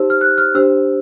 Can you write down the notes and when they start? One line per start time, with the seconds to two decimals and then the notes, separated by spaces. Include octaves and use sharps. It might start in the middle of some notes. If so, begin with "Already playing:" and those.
Already playing: D#4 G4 C5 E6
0.10 F6
0.21 F#6
0.38 F6
0.54 D4 G4 C5 E6